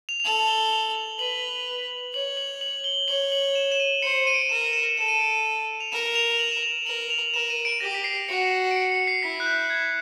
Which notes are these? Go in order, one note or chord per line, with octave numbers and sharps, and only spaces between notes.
F7
F7
A4 F#7
G7
F7
F#7
B4 F#7
C#5 F#7
F#7
F#7
G7
C#5 F#7
F#7
E7
E7
D#7
C5 C#7
D#7
D7
D#7
A#4 E7
E7
A4 E7
D#7
D7
D#7
F7
A#4 E7
F7
F#7
E7
F7
A#4 F#7
F7
A#4 E7
D#7
D7
G4 A#6
B6
C7
F#4 C#7
D7
C#7
C#7
C7
E4 B6
F#6
G6
G#6